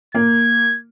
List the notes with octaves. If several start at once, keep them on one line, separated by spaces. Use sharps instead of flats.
A#3 G#6